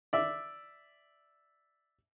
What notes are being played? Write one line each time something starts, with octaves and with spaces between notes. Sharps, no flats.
D5 E5